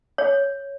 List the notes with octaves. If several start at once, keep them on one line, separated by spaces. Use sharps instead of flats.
C#5